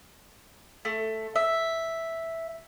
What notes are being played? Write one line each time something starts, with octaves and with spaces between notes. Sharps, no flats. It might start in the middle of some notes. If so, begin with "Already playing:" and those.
A3
E5